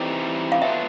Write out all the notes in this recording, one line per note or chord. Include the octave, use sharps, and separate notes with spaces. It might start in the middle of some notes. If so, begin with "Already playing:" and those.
Already playing: E3 G3 C4 D#4
F5
F#3 B3 D4 F4 E5